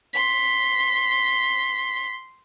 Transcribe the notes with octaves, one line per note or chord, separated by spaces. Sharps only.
C6 B6